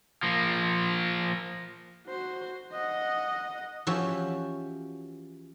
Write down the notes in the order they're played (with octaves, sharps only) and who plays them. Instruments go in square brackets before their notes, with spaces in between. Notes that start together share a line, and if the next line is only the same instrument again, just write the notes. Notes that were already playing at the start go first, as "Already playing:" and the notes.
[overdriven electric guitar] F3 A#3
[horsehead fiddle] F#4 C5
D#5 F#5
[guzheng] E3 F3 C#4 F#4 G4 E5